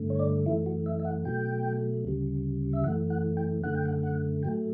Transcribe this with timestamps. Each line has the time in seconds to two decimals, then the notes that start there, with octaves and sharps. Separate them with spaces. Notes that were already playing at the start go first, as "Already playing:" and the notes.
Already playing: G2 D3 A3
0.10 C#5
0.19 D5
0.46 F#2 E3 A3 E4
0.66 F#4
0.86 E5
1.00 E5
1.05 F#5
1.25 B2 F#3 A3 G5
2.05 D2 C#3 G3
2.73 E5
2.84 F#2 E3 A3 F#5
3.10 F#5
3.37 G5
3.63 F#2 D3 A3 F#5
3.75 G5
3.85 F#5
4.03 F#5
4.43 A2 F#3 A3 G5